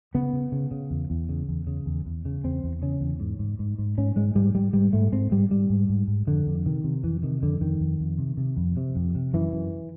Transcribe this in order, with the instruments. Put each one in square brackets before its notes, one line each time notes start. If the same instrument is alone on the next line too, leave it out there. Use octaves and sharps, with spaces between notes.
[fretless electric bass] C#3 B3
C#3
C#3
C#3
E2
E2
C#3
E2
C#3
E2
E2
C#3
E2 C4
E2
C#3 C#4
E2
G#2
G#2
G#2
G#2
G#2 C#4
G#2 G#3
G#2 G3
G#2 G3
G#2 G3
G#2 A3
G#2 C4
G#2 G3
G#2 G3
G#2
G#2
G#2
F2 D3
F2
C3 D#3
C3
F2 E3
C3 D#3
F2 D3
F2 D#3
F2
F2
C3
C3
F2
C3
F2
C3
F#2 E3
F#2